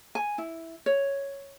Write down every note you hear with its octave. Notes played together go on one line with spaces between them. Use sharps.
G#5
E4
C#5